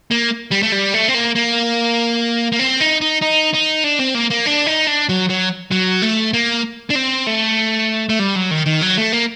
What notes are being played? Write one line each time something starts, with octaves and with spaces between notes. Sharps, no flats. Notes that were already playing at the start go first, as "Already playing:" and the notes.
A#3
G3
A3
G3
A3
C4
A#3
A#3
A#3
C4
D#4
D#4
D#4
D#4
D4
C4
A#3
A#3
D4
D#4
D4
F#3
F#3
F#3
A3
A#3
D4
C4
A3
A3
G3
F#3
D#3
D#3
F#3
A3
A#3